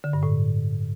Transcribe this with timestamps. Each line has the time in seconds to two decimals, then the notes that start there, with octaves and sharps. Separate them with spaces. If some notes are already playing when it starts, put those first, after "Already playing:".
0.04 D3
0.13 G2
0.23 A2